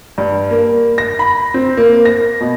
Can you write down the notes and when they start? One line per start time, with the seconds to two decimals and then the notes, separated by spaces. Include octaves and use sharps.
0.18 G2
0.50 A#3
0.98 A#6
1.19 B5
1.54 C4
1.77 A#3
2.05 A#6
2.41 B2